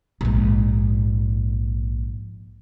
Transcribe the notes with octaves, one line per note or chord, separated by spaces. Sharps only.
A#1 G#2